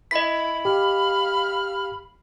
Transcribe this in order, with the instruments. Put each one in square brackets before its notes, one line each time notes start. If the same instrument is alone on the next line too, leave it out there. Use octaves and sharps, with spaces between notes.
[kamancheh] E4 [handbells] D#5 B6 [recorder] B5
[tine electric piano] G4 [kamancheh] F5 F6